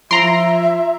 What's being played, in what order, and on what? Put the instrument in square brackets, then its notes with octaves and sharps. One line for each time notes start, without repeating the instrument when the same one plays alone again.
[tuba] F3 [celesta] F4 C7 D7 [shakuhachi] E5 [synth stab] A#5 C6